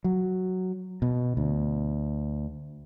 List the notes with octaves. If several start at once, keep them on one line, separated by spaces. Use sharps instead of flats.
F#3
B2
D2